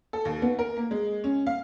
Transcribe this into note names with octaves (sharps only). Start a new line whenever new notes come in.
A4
D#2
B3
A#4
A#3
G#3
C#4
F5